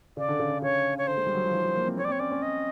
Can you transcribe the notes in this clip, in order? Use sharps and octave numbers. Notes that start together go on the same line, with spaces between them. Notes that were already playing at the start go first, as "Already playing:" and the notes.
C#3 D5
D3
C#3
D3
C#3 C#5
C#5
D3 C5
G#3
G3
F#3
F3
E3
F3
A#3
C4
C4 C#5
D5
C4 C#5
C#4 D5
C#4
D#5